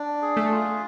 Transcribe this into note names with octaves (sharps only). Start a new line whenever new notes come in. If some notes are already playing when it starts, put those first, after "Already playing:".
Already playing: D4
G#4
A3
F4